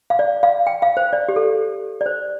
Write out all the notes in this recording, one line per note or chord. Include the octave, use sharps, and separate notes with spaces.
F5
D5
F5
G5
F5
C5
D5
G4
A4
D5
C5